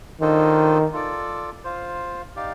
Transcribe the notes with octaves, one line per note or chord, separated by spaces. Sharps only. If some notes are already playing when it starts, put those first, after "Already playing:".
D#3 D4 F4 A4 C5 D#5
F4 A4 D5
F4 C5 F5
D#4 G4 D5 F5